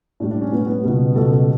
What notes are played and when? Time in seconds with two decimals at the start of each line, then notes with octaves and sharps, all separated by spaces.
0.20 A2 G3 D4
0.31 D4
0.42 C#4
0.52 A2 G3 B3
0.59 C#4
0.66 B3
0.83 C#2 B2 G3
1.15 C#2 B2 G3 A4
1.32 A4